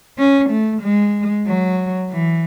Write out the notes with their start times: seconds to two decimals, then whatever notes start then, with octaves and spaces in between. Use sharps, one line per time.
0.18 C#4
0.50 A3
0.82 G#3
1.46 F#3
2.10 E3